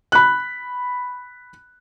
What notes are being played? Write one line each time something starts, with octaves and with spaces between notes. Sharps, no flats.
B5 F#6